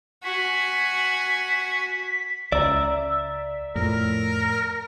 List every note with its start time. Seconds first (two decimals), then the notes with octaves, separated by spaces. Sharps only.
0.24 F#4 G#5 B6
2.52 C#2 D5 E5 A#5
3.75 F2 A2 A#4